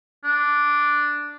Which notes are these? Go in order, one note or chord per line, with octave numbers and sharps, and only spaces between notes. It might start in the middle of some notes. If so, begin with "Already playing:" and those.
D4